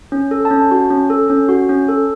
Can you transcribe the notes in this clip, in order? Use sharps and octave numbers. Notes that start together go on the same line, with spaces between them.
C#4
A4
A5
C#4
F#4
C#4
A4
C#4
F#4
C#4
A4